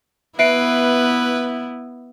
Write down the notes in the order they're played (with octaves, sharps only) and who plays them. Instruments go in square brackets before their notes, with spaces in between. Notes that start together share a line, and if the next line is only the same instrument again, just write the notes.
[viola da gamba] B3 E4 [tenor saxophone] B4 [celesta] E5 C7 D7